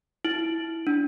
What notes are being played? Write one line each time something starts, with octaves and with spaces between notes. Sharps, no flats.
E4
D4